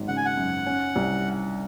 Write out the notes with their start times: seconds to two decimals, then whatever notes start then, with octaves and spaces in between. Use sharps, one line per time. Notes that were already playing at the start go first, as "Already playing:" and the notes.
Already playing: G#1 F#3
0.08 C#3 F#5
0.17 G#5
0.25 F#5
0.37 F#2
0.66 C#4
0.96 C2